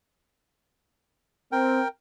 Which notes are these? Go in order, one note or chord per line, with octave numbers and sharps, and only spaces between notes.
C4 A#4 G5